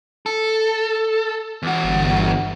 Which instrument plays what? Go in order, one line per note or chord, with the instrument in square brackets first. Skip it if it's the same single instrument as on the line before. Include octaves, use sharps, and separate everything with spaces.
[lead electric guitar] A4
E2 F#4
[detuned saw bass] G1